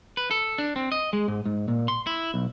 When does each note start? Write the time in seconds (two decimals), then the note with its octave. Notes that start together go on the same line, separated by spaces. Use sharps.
0.17 B4
0.31 A4
0.58 D4
0.76 C4
0.92 D#5
1.13 G#3
1.28 G#2
1.46 G#2
1.68 A#2
1.88 C6
2.07 E4
2.34 B1